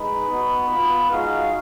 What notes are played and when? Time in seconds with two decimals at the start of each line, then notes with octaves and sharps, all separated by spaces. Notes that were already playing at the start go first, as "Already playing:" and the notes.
Already playing: G#3 D#4 B4 B5
0.28 B3 D#4 F#4
0.68 B3 F4 B4 B5
1.10 G#3 D#4 F4 F#4 F5